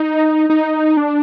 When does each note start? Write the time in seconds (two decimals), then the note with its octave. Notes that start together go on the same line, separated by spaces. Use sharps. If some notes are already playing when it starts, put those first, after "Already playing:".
Already playing: D#4
0.50 D#4
0.97 D4